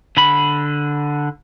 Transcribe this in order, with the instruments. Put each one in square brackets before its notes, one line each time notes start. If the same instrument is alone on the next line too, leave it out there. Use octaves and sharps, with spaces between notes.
[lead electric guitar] D3 B5